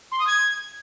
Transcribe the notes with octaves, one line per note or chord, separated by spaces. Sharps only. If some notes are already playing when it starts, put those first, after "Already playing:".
C6
D#6
G#6